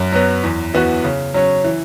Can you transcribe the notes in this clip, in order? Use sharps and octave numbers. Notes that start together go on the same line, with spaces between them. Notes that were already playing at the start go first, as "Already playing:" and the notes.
Already playing: F#2
F#3 B3
E2
E3 B3 F#4
C#3
F#3 C#4
E3